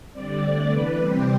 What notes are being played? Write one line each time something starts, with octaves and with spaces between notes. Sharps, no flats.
D3 G3 C4 D5
D3 A3 C4 D5
C3 E3 B3 B4
C3 G3 C4 G4